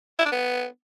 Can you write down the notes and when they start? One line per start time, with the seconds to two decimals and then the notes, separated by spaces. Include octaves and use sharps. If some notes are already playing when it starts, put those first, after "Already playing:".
0.19 E4
0.25 D4
0.32 B3